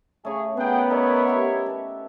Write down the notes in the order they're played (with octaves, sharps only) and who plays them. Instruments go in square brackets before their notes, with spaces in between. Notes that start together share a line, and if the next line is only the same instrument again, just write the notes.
[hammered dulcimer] C#3 A3 [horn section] G#4 C#5
[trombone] B3 [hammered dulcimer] C#4 A#4 [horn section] G#4 F#5 G5
[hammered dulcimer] D#4 [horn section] E4 A#4 C#5
[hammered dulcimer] G4 E5
A4 B4